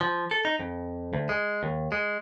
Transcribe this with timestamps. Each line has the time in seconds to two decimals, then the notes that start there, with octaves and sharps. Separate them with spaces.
0.01 F3
0.31 A4
0.45 D#4
0.59 F2
1.13 D2
1.29 G#3
1.63 D#2
1.92 G#3